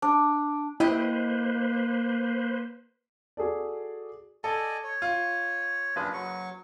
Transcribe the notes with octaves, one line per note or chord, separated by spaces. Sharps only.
D4
A#3 E4 G4 B4 C5 D#5
F#4 G#4 A4 D5
A4 D5 D#5 G#5
C#5
F4
F#1 D4 F4 G#4 B4
F#3 C#6